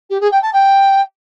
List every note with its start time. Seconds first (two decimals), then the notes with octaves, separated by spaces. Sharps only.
0.09 G4
0.20 G#4
0.31 G5
0.42 A5
0.53 G5